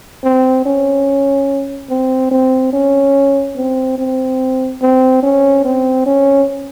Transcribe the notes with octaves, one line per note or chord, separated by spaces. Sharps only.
C4
C#4
C4
C4
C#4
C4
C4
C4
C#4
C4
C#4